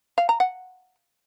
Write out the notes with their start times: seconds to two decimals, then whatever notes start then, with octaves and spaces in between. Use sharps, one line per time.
0.18 F5
0.29 A#5
0.40 F#5